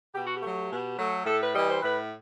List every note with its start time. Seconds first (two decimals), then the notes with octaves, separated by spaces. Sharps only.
0.14 B2 G4
0.25 F#4
0.35 G4
0.42 F#3 A3
0.71 B2
0.98 F#3 A3
1.26 A2 A4
1.41 B4
1.54 E3 G3 D#5
1.68 C5
1.83 A2 B4